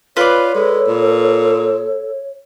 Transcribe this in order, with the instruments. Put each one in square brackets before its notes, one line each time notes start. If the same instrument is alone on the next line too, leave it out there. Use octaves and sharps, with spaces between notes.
[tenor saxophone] F4 [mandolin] B4 D5 [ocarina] C#5
[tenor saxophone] G#3 [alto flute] A4
[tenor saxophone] A#2